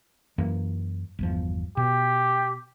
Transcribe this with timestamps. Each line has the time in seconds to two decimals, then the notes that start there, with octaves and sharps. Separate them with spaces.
0.38 F#2 E3 A#3
1.19 G1 E2 F3
1.77 B2 G4